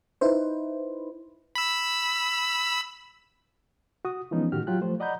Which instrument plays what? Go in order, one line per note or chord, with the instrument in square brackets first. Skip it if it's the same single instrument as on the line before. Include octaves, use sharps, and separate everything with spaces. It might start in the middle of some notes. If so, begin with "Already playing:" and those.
[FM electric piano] D#4 E4 B4 C5
[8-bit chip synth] B5 E6
[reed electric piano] F#4 D#6
E3 F3 G#3 B3 C#4 D#4
A2 D#3 F#4 G4 F6
F#3 F4 G4 G5 F#6
F3 A3 C5
D5 D#5 F#5 A#5 B5 G6